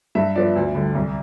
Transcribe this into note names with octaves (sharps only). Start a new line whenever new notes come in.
G2 E5
F3 B3 D5
D2
D3 G3
C2